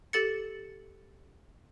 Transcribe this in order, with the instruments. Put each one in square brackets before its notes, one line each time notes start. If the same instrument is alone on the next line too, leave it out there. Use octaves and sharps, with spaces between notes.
[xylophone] G4 A4 A6 C#7